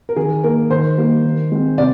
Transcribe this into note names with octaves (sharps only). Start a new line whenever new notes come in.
A#4
D#3 G#4
A#3 A#4
D#3 C5
G3 A#3
D#3
G#3 C4
C3 D5